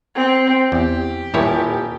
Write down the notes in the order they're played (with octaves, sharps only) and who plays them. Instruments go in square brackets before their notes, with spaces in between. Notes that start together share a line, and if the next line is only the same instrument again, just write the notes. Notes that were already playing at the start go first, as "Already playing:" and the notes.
[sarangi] C4
[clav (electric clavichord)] E2 [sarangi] G4
[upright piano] D#1 [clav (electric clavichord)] A#2 E4 C#5